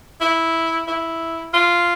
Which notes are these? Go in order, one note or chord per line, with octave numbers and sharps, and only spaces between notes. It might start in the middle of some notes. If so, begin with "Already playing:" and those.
E4
E4
F4